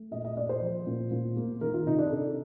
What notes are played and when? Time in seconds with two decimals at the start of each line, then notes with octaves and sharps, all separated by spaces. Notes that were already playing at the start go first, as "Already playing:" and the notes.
Already playing: A3
0.11 A#2 D#5
0.25 D#5
0.37 A#2 D5
0.49 C5
0.61 F3
0.87 A#2
1.12 A#2
1.37 A#3
1.61 D#3 A#4
1.74 F4
1.86 C3 D#4
1.99 D4
2.11 C3 A4